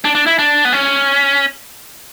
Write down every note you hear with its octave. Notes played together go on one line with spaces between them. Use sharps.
D4
D4
E4
D4
B3
C#4